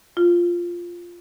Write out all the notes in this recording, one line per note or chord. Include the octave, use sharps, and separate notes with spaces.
F4